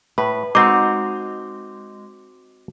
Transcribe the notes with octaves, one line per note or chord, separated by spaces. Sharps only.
A2 B4
G#3 C4 D#4 F#4 G#4 D6